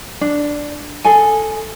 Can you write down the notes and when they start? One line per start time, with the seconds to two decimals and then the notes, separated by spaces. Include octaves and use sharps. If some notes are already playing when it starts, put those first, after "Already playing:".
0.21 D4
1.04 G#4 A4 G#5